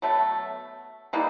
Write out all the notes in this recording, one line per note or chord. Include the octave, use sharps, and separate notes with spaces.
B2 F#3 A3
E3 G3 A#3 D#4